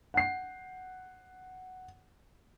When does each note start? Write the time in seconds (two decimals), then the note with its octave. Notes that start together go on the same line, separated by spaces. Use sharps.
0.14 F#5 C7